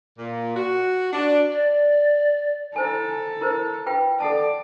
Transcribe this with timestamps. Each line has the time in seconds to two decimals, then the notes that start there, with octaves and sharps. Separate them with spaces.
0.18 A#2
0.56 F#4
1.13 D4
1.51 D5
2.76 E4 A4 C5 G#5
3.41 E4 A#4 C5
3.86 F4 B4 G5
4.20 A4 D5 F#5 A5